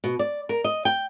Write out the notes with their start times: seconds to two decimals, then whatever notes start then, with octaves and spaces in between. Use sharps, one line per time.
0.04 B2
0.19 D5
0.49 A#4
0.64 D#5
0.85 G5